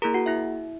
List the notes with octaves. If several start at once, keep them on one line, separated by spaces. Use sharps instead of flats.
A#3 E4 G#4 A#4 A#5
F#4 F#5
E4 E5